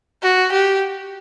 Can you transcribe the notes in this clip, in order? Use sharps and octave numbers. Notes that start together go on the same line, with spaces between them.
F#4
G4